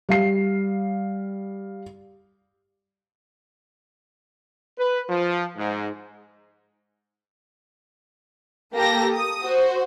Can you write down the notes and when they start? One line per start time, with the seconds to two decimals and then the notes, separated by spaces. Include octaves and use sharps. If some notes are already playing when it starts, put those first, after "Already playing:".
0.09 G3 F5 C7
4.78 B4
5.09 F3
5.57 G#2
8.74 A#3 G4 A4 A#6
9.15 D#6
9.44 F#4 C5